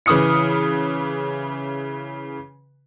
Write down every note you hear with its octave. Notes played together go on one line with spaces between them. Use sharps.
C#3 E3 B4 D#6 F6 C#7